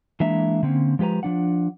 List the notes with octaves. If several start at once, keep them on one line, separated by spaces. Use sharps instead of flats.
E3 G#3 A#3 D4 E5 A#5
D3 A#3 C4 C#4
F3 G#3 G4 B4 A#5
F3 D4 F#5